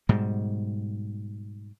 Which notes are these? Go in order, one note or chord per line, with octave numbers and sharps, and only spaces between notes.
G#2 B2 G3